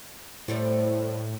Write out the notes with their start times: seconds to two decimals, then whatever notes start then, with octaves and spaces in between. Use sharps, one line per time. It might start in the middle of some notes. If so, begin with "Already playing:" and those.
0.48 A2 G3 A3 C4